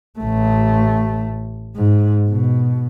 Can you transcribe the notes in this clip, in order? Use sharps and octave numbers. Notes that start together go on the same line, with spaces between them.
A1 A3
G#2
B2